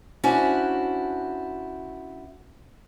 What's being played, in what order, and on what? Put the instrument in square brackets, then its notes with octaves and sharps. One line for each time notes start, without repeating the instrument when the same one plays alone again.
[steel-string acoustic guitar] C#4 D4 E4 F#4 C5